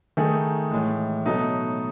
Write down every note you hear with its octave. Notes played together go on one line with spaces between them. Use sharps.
D#3 A3 D#4 G#4
A2 E3 G#3
B2 F#3 A3 D#4